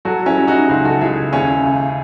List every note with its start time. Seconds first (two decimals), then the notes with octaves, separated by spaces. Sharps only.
0.05 F#3 F#4 A4
0.26 C#4 E4
0.37 F#3
0.47 D#4 F#4
0.69 C#2 D#4 F#4
0.85 F#4 A4
1.01 C#2 E4 G#4
1.33 D#2 C#4 E4
1.65 C#3